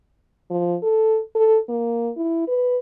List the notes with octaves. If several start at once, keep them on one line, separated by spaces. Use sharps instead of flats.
F3
A4
A4
A#3
E4
B4